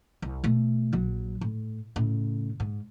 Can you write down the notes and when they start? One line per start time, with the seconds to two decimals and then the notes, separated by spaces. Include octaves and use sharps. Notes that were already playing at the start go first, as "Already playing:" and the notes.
0.22 C2
0.44 B2 A3
0.93 A#1 F#3
1.41 A2
1.96 A2 C#3
2.60 G#2